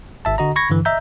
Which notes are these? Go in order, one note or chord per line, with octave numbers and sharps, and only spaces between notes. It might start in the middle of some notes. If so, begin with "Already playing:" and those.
G#1 E5 A5
D3 F#4 D#5 A#5
B5 C#6 G#6 A#6
G2 D3 E3
D#5 E5 A#5 G6